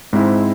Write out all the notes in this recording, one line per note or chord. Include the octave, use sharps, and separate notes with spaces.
G#2 G#3 C4 E4